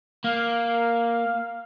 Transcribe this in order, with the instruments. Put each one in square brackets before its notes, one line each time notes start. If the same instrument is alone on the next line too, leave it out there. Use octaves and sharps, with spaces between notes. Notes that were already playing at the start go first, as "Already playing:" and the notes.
[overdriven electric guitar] A#3 [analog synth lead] F5